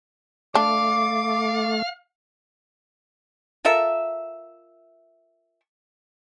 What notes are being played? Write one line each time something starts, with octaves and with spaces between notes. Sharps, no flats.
A3 D4 F5 D6
F4 A4 A#4 E5